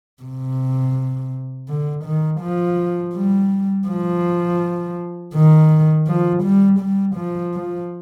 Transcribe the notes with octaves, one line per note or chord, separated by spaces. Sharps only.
C3
D3
D#3
F3
G3
F3
D#3
F3
G3
G3
F3
F3